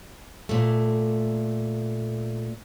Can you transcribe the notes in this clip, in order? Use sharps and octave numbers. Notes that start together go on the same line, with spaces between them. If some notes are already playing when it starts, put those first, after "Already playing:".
A#2 A3